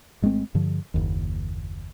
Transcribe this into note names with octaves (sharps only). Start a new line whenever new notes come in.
G#1 G#3 A3 C4
G2 D3 F3
F#1 D#2